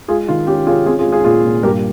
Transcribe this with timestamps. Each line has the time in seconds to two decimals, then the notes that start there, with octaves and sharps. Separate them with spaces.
0.08 G#3 F4 G#4
0.28 D#3 F4
0.47 C#4 G4
0.66 C#4 F4 G#4
0.86 C4 F4 G#4
0.99 F4 G#4
1.06 G#3
1.12 F4 G#4
1.24 A#2 F4 G#4
1.44 A#2
1.63 G2 G4 A#4